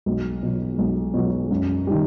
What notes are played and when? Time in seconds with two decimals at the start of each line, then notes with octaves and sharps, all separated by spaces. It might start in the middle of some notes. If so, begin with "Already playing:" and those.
0.06 B1
0.43 B2 F#3
0.78 B1
1.14 B2 F#3
1.51 F#2
1.87 D#3 G3